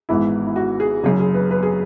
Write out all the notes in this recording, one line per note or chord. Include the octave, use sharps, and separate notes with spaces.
G#1 G#2 E3 B3 E4
E4
F#4
G#4
F#1 F#2 C#3 G#4
G#4
B4
B4
G#4